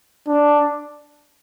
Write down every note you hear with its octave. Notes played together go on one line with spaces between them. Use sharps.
D4